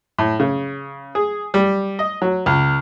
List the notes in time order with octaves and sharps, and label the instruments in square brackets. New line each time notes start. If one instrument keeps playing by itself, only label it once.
[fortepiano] A2
C#3
G#4
G3
D#5
F#3
C#2